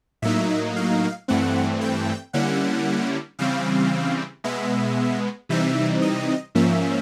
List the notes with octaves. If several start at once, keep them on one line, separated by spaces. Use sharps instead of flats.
A2 F#3 A#3 D#4 E5
F5
G2 E3 A3 C4 F#5
G5
D3 G3 A#3 C#4 E4 F#5
C#3 E3 G3 C4 F5
B2 G#3 B3 E5
C3 E3 G3 C4 D#4 E5
D#5
G#2 F3 A#3 C#4 E5